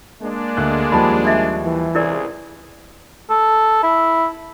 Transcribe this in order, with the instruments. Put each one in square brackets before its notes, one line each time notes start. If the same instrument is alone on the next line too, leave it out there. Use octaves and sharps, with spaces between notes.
[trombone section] G#3 D4 [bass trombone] A#3
[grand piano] D2 F#6
[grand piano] D#2 F3 G3 [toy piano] A5 B5
[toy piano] D5 E5
[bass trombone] E3
[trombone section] C#2 C3 G#4 [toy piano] E4 A#4 D5
[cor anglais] A4
E4